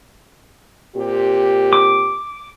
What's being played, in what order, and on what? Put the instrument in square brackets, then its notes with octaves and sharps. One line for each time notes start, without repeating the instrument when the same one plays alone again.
[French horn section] A#2 C4 G4
[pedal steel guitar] D6